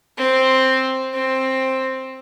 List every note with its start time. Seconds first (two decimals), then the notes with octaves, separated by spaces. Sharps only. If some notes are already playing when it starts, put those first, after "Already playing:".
0.18 C4
1.15 C4